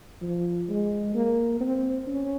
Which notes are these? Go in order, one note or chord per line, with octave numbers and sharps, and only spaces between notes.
F3
G#3
A#3
C4
C#4